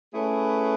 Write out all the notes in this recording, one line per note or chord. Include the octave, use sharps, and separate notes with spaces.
A3 C#4 E4 G#4 B4